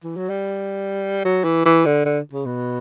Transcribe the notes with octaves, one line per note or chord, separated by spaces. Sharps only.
E3
F#3
G3
F#3
E3
E3
D3
D3
C#3
B2